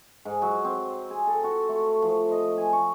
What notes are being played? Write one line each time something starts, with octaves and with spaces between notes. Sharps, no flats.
G#2
F#3
C4
G#4
A4
F#4
A3
F3
D#5
G#5
C#6